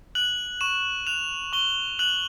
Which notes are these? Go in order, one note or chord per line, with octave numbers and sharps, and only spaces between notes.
F#6 F#7
C#6 E7
F#6 F7
C#6 G7
F#6 F#7